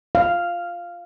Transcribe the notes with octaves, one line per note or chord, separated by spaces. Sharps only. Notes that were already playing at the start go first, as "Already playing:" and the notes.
F5